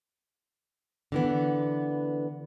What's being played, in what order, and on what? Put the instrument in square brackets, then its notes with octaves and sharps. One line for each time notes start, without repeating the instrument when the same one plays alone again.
[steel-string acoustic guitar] D3 E3 B3